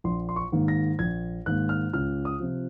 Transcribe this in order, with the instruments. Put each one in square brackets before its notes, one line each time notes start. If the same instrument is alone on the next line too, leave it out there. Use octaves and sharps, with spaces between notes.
[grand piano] A#1 C6
C6
C#6
G#2 D#3 A#3
A#6
A#1 G#6
G#2 D#3 A#3 F#6
F6
C#2 F6
D#6
C3 F3